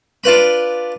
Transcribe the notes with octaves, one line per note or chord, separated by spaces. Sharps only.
D4 F4 B4 B5